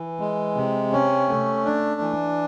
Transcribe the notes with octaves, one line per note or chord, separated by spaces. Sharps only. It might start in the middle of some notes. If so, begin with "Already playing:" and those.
Already playing: E3
G#3
C3
C#4
A3
D4
E3